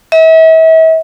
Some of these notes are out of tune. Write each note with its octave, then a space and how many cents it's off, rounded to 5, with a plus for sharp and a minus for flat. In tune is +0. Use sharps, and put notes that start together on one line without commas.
E5 -40